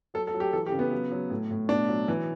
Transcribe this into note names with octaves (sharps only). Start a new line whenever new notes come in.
F#3 A4
A4
F#3
G4
E3 A4
G4
C#3
B3
F#3
F#3
A2
A2
B2 D4
F#3
E3